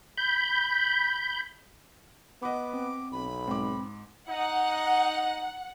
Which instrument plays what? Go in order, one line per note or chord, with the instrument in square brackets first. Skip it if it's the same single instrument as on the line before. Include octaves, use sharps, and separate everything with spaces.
[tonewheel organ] B5 G6
[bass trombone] B3 [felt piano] D#5 F#5 B5 [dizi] D6
[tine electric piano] C4
[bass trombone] B1 [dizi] B5
[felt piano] G#2 D6 [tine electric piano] C4
[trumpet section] D#4 [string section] F#5